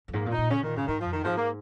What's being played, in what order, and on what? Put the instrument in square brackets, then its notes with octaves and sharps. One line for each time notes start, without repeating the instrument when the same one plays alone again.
[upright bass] F2
[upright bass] G#2 [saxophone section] A#3
[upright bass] A#2
[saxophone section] D#4
[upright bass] A#2
[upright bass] C#3 [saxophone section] C#4
[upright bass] A#2 [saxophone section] D#3
[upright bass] G#2 [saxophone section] C#3
[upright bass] G#2 [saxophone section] D#3
[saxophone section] F3
[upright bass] F2
[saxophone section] D#3
[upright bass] G#2 [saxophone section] F3
[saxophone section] A#3